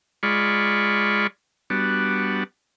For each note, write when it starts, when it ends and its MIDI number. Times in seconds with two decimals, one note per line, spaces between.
0.23 1.27 56
0.23 1.27 65
0.23 1.27 74
0.23 1.27 83
0.23 1.27 85
1.70 2.44 55
1.70 2.44 59
1.70 2.44 62
1.70 2.44 66